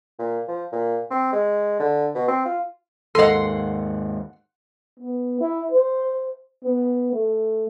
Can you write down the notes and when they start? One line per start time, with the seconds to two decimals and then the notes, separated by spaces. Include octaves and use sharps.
0.19 A#2
0.48 F3
0.72 A#2
1.10 C4
1.33 G#3
1.80 D3
2.15 B2
2.28 C4
2.45 F4
3.15 D#2 G#2 A4 D#5 F#5 C6
5.00 B3
5.41 E4
5.71 C5
6.64 B3
7.13 A3